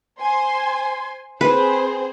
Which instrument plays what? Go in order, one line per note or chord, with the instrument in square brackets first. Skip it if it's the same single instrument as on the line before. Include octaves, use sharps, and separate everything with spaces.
[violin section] C5 G#5 C6
[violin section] C4 G#4 C5 [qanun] B4